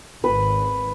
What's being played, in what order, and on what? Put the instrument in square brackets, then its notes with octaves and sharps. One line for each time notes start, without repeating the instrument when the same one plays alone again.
[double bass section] G#1 [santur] B4